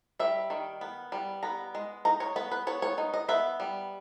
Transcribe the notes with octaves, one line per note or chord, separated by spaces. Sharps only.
G3 E5
D#3
B3
G3
B3 A#5
G#3
D#4 A#5
C#5
B3 B4
B4
B3 C#5
C#5
D#4
D#5
B3 E5
G3